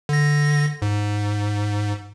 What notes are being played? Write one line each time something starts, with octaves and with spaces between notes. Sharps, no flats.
D3 A#6
G#2